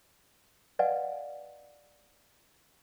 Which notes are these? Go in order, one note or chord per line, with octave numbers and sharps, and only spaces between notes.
B4 D5 D#5 F5 F#5 G#5